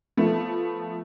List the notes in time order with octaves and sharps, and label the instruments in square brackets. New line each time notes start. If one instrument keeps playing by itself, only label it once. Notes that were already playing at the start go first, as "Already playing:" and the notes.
[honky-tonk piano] F3 A3 B3